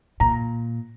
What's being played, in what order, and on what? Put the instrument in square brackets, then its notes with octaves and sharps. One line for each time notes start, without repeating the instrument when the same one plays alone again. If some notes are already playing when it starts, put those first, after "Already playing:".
[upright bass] A#2 [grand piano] A#5